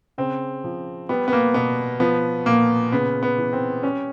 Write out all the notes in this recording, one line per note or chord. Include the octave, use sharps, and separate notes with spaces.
C#3 C4
F3
G3 B3
B3
A#3
B2 B3
F3 B3
A#2 A#3
C#3 B3
B3
E3
C4
G3 C#4